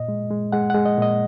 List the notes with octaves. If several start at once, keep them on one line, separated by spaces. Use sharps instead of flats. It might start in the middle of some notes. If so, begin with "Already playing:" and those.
Already playing: A#2 D#5
G#3
G#3
G#3 F#5
F#5
G#3
D#5
A#2 D#5